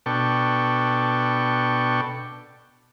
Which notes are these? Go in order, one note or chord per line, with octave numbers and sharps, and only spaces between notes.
B2 D4 A4 G5 C#6